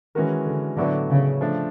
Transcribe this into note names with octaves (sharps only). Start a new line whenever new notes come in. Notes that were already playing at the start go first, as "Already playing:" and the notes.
D#3 E3 G#3 C#4 F#4 A#4
D3
A2 D3 F#3 B3 E4
C#3
F3 A3 D4